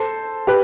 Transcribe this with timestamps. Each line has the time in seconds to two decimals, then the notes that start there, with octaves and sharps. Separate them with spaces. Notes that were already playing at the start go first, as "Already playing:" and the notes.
Already playing: A4 C5
0.47 G4 B4